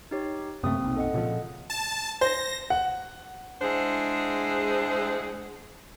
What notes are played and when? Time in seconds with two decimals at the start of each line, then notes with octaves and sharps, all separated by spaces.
0.11 D#4 G4 C#5
0.63 F#2 C3 A3 A#3 C4 D#6
0.80 D#1 B1
0.96 A4 D#5 F#5
1.14 A#2 C#3 F3
1.70 A5
2.21 C5 A#6
2.70 F#5
3.62 G#3 D4 E4 G#4 C5 F#5